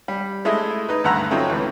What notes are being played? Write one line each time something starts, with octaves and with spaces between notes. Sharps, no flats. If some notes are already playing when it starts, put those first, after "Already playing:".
G3
G#3 A3 E4 D#5
D#4 B4
D2 G2 F#5 A#5 E6
F#3 A3 C4 C#4 D#4 F4
C#2 E3